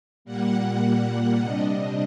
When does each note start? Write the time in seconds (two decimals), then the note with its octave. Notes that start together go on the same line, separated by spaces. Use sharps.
0.25 A#2 G3 A#3 F#5
1.39 C3 G3 D4 D#5